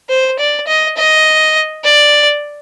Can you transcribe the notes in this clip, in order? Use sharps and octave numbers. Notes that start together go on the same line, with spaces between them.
C5
D5
D#5
D#5
D5